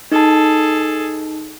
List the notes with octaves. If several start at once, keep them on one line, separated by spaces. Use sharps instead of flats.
D#4 G#4 A4 A5